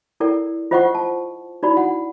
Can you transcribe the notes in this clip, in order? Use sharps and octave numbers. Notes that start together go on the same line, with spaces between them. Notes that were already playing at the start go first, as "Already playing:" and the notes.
E4 A4 A#4 D5 G5
F4 C5 D#5 F#5 G5 C#6
A5
D#4 E4 F#4 D5 B5
F#5